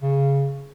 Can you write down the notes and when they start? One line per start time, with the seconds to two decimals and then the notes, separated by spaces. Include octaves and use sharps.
0.02 C#3